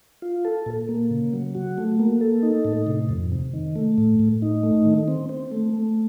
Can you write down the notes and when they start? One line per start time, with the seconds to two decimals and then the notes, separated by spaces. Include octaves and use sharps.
0.22 F4
0.45 A4
0.66 A#2
0.89 A#3
1.10 C#3
1.33 F#3
1.55 F#4
1.78 A3
1.99 A#3
2.21 A4
2.43 D#4
2.65 A2
2.87 C3
3.09 F2
3.32 C3
3.54 D#3
3.76 A3
3.98 A2
4.20 A2
4.42 D#4
4.63 A3
4.85 D#3
5.08 C4
5.29 C4
5.52 A3
5.73 A3